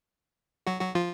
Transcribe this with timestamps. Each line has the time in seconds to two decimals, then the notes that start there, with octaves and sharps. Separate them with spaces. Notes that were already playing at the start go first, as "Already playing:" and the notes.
0.67 F#3 F#4
0.81 F#3 F#4
0.95 F3 F4